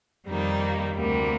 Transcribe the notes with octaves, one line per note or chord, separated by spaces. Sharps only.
F2 D#3 G3 A#3 D#4
D2 C3 G3 A#3